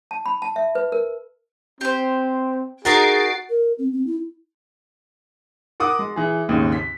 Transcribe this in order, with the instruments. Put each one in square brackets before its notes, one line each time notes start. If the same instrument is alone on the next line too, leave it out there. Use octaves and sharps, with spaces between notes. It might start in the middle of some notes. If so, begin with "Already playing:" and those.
[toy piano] A5
B5
A5
E5
B4
A#4
[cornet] C4 [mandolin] G4 C5
[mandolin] D#4 A#4 D#5 [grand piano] F#4 [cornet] G#4 [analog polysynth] A6 C7 D7
[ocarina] A#4
C4
C4
E4
[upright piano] A#4 F#5 D6 D#6
G#3
E3 G#4
G#1 D#2 G#2 C#3
B6